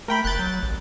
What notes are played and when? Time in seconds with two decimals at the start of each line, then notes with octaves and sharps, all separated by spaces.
0.08 A3 A#4 G5 B5
0.25 F#1 F#6 G6 A6
0.39 F#3
0.63 A1